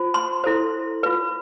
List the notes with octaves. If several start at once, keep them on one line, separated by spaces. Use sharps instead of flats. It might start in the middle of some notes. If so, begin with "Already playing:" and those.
Already playing: F4 C5
C6
E4 A4 C5
F4 B4